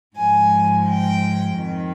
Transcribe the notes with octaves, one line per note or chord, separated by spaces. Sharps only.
G#2 F3 G#3 G#5
G5
F2 D#3